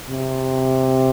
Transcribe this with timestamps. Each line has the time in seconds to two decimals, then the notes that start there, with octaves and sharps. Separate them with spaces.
0.10 C3